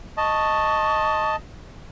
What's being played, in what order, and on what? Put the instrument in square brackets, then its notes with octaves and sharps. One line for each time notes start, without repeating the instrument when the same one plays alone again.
[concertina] D#5 A5 [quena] C#6